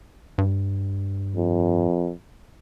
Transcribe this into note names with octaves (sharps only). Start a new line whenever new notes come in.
G2
F2